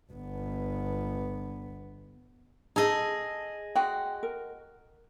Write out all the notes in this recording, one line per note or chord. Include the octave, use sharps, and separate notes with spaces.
G1 B3
D#4 G#4 A4 D#5
G#3 F#4 G5
A#4